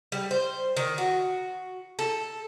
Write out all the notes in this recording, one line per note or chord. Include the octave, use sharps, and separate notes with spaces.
G3
C5
D#3
F#4
A4